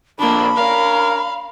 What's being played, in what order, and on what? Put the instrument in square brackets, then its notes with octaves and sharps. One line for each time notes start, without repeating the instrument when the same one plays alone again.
[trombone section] A#1 F2 [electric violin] A#3 D4 [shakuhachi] B5
[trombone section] C#4 D4 A#4 [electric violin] F5